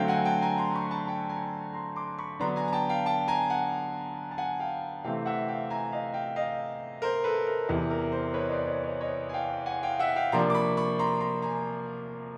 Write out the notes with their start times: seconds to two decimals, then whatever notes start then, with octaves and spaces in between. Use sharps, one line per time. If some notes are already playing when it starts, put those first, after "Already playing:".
Already playing: D3 F#3 A3 C4 F5 G5
0.08 F#5 G#5
0.25 G5 A5
0.42 G#5 A#5
0.58 A#5 C6
0.75 B5 C#6
0.91 A5 B5
1.07 G5 A5
1.29 G#5 A#5
1.73 A#5 C6
1.96 C6 D6
2.18 B5 C#6
2.39 D3 F#3 B3 D4 A#5 C6
2.56 G#5 A#5
2.68 A#5
2.73 G5 A5
2.89 F5 G5
3.06 G5 A5
3.28 G#5 A#5
3.50 F#5 G#5
4.31 A5
4.38 F#5 G#5
4.60 F5 G5
5.04 C3 E3 A3 C4 F5 G5
5.26 E5 F#5
5.48 F5 G5
5.70 G#5 A#5
5.92 D#5 F5
6.14 F5 G5
6.36 D#5 F5
7.02 A#4 C5
7.24 A4 B4
7.47 A#4
7.69 E2 C3 E3
7.90 A#4
8.12 A#4 C5
8.34 B4 C#5
8.46 D#5
8.50 C5 D5
8.67 C#5 D#5
8.84 C#5 D#5
9.01 C#5 D#5
9.29 G#5
9.33 F5 G5
9.66 F#5 G#5
9.83 F5 G5
9.99 E5 F#5
10.16 F5 G5
10.32 C3 F3 A#3 D4 A#5 C6
10.50 D6
10.54 B5 C#6
10.77 B5 C#6
10.99 A#5 C6
11.20 A#5 C6
11.42 G#5 A#5